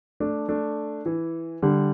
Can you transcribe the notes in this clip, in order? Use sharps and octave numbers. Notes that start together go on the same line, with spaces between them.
A3 D4
A3 D4
E3
D3 G3